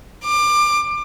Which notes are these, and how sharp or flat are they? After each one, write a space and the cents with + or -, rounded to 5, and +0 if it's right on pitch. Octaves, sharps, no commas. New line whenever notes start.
D6 +25